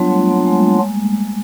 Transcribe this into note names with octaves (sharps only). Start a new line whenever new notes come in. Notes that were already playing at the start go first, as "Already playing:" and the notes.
Already playing: F#3 G3 B3 D4 F4
A3
A#3
G#3